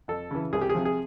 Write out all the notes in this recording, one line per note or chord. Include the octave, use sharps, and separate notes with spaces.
F2 A4
C#3 E3
C2 G#4
G4
G#4
C3 F3
G#4